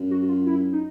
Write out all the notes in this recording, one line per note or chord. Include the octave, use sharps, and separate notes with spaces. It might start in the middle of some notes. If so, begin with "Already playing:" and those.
Already playing: F#2
F#4
F4
E4
D#4